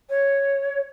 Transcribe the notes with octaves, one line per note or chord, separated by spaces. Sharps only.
C#5